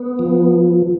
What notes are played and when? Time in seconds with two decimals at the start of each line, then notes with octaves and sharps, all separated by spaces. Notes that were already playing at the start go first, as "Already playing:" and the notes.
Already playing: B3
0.19 F3